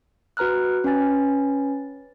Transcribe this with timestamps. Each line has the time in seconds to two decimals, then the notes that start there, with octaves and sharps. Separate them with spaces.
0.37 F#4 B4 A#5 F6 F#6
0.84 C#4 B4 G#5 A6